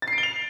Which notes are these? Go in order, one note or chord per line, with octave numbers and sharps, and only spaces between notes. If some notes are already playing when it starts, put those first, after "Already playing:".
A6
C7
D7
G7
F7